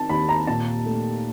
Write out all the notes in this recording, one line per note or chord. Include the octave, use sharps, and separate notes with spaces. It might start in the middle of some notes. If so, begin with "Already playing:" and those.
Already playing: D#3 A5
D#2 B5
A#5
A#2 A5
A3